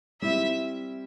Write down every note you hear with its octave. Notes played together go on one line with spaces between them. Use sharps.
G3 C4 E4 E5